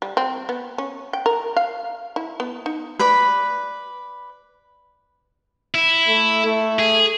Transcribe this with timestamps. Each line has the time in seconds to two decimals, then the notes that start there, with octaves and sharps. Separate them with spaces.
0.02 G3
0.17 C4
0.49 B3
0.78 C#4
1.13 G5
1.26 A#4
1.56 F5
2.16 E4
2.40 B3
2.66 D#4
2.99 B4 D5 B5
5.75 E4
6.08 A3
6.46 A3
6.79 G#4